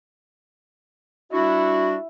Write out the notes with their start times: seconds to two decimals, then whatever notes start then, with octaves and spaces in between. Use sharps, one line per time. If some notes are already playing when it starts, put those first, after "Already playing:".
1.32 G3 D4 E4 F#4